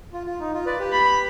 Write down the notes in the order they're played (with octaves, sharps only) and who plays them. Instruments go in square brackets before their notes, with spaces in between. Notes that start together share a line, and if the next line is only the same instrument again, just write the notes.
[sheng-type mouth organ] F4
F4
D#4
F4
B4 D5
G4 B4
[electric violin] B5